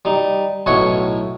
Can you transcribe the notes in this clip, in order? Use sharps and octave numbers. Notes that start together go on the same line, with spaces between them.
G3 D#4
B1 A2 E4 C#5 D#5 F#5